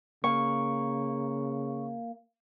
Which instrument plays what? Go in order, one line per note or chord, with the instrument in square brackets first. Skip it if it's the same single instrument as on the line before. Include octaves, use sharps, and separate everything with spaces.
[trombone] C#3 [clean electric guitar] A#3 [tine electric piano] C#6